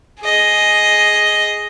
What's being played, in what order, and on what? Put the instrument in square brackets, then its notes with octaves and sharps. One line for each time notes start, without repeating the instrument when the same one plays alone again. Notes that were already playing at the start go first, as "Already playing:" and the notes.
[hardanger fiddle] G#4 D#5